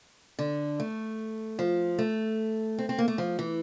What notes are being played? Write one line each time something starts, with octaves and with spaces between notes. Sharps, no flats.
D3
A3
F3
A3
C4
C4
A#3
A3
F3
E3